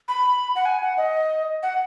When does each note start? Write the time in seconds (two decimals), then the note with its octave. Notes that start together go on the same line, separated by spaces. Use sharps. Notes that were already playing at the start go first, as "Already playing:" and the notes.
0.08 B5
0.55 F#5
0.65 G#5
0.82 F#5
0.97 D#5
1.63 F#5